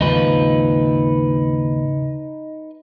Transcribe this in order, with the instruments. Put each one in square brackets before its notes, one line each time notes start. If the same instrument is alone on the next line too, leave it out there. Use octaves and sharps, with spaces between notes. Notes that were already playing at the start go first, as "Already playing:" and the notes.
[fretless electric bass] D#2 G#2 F3 [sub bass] C#3 [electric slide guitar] D#4 B4